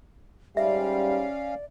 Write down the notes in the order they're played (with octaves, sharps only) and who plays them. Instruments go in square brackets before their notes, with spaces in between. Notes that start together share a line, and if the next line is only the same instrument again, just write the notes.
[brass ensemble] G#2 G3 [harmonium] C#4 F5 [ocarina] D5 [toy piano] E5